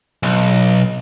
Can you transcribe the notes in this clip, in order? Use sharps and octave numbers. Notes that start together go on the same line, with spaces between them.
B1